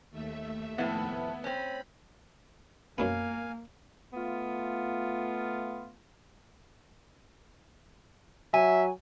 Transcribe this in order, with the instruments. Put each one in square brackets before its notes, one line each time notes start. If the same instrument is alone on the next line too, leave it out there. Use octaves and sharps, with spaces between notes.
[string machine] D#2 A3 E5
[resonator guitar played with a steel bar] F2 A2 [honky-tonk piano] B3 E4
[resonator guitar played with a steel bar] C4 C#4 [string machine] B5
[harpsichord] F#2 F#3 B3 [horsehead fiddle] A#3 [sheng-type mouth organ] F5 G#5
[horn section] A3 B3 F4
[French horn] F#3 [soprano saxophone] E5 [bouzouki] G#5